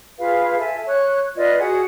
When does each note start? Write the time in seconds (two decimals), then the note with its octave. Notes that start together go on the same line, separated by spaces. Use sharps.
0.19 F4 G#4 B4 F5
0.59 A4 E5 G#5
0.87 C#5 F#6
1.36 F4 B4 D5 D#5
1.60 F#4 G#4 F#5